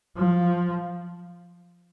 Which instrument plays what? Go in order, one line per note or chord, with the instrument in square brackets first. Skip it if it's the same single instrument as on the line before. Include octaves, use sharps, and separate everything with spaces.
[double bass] F3